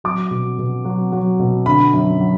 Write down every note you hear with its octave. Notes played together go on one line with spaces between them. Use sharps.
F#3 D6
B2
B2
F#3
F#3
B2
D3 B5
F#2
F#3